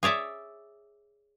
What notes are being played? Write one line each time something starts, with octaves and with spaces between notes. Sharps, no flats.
G#4 C#5 D5 E5